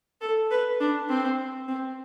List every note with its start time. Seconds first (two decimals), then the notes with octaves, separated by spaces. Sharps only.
0.21 A4
0.51 B4
0.80 D4
1.09 C4
1.68 C4